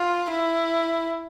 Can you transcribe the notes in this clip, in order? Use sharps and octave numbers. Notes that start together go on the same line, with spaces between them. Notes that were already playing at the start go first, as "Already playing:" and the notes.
Already playing: F4
E4